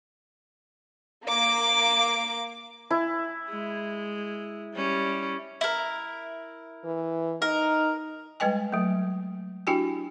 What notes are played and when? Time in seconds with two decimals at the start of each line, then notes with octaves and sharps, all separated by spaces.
1.25 A#3 D6
2.90 E4
3.49 G#3
4.74 G3 C#4
5.61 E4 A#4
6.84 E3
7.42 D#4 A#4
8.40 G3 G#3 B4 D#5 G5 G#5
8.72 F#3 A3
9.67 D4 E4 F#4 G4 G5 G#5